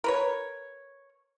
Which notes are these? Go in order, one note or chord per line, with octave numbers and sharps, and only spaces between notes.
A#4 B4 C#5